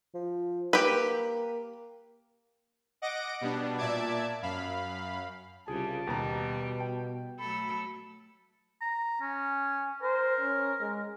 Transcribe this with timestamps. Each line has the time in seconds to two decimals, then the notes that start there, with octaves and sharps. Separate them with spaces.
0.14 F3
0.73 A#3 G4 B4
3.02 D#5 F#5 D6 A#6 D7
3.41 B2 G3 B3 D4
3.78 A#2 D5 E5 A5 D6 G#6
4.42 F#2 F5 B5
5.68 C2 C#3 G3 F4 G#4 A5
6.07 D#2 B2 G3 B3 A#5
6.80 G5
7.40 F#3 A3 A4 B5
8.81 A#5
9.21 C#4 G#5
10.02 A#4 C5
10.41 C#4
10.81 G#3